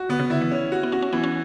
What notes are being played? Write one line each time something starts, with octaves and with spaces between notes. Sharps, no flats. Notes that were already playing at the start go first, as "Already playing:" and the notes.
Already playing: F#4
D3 B3
C#3
D3 E4
E3
C#4
F#4
B3
C#4 F#4
C#4
E3 B3
C#4